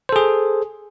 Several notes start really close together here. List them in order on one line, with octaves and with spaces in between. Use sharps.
C5 A4 G#4